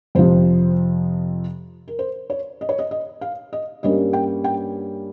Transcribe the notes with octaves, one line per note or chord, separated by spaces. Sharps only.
F2 C3 F3 C5
A#4
C5
C#5
D#5
C#5
D#5
D#5
F5
D#5
G2 G3 A#3 C#4 D#5
G5
G5